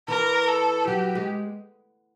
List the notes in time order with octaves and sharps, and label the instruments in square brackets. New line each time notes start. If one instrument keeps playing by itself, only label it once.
[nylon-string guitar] E3 [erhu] A#4
[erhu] A4
[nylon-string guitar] F#3 [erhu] G4
[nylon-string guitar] G#3